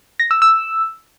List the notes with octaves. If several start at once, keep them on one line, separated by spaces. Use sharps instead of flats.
A#6
E6
E6